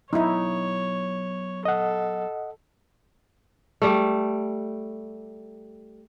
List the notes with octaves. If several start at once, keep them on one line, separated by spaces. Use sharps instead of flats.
F#3 B3 D#4 E4 C#5
A4 D#5 F#5
G3 A3